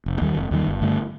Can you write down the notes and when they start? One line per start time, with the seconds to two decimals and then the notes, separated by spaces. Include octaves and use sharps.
0.06 F1
0.21 D#2 D#3 G3
0.36 F1
0.51 D#2 D#3 G3
0.67 G1
0.81 G2 D3 A3